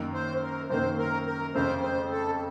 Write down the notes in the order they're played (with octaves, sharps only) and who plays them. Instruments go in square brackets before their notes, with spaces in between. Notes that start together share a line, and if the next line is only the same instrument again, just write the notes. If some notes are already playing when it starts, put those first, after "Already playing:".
Already playing: [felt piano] F#2 D#3 A#3
[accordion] C5
A#4
[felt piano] F#2 D#3 A#3 [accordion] C5
[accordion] A#4
A#4
[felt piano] F2 C#3 A3 [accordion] C5
[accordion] C5
A4